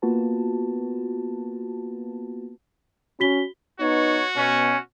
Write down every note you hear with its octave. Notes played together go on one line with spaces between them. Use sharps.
A#3 B3 F4 F#4 B4 A5
C#4 F#4 B6 G7
B3 D#4 F#4 C#5
B2 C#4